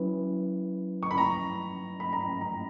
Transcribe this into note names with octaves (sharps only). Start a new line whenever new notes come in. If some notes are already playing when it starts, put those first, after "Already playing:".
Already playing: F#3 C#4 E4 B4
C#6
B5
A#5
B5
A#5
B5
A#5